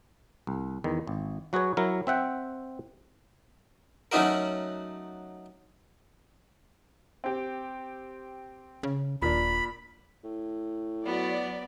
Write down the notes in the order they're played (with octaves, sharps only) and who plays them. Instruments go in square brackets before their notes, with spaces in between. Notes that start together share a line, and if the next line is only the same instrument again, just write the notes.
[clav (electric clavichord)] C2
E2 D#3
G#1
F#3 F#4 G#4 B4 C#5
F#3 E4 A#4
C4 E5 F#5 G5
[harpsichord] F#3 A3 C#4 D#4 F#4 A#4
[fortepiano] C4 G4
[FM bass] C#3
[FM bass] D#1 [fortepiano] A#2 D4 [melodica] B5
[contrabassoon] A2
[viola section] F#3 [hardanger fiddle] B3 [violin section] D5 B5